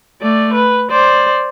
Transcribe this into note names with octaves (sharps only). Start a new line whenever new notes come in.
A3 D5
B4
C5 D5